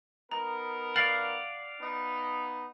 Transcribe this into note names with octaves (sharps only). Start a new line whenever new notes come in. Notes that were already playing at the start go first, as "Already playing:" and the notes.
B3 D#4 A#4 A#5
D5 F5 F#5 F6 A6 C7
B3 D#4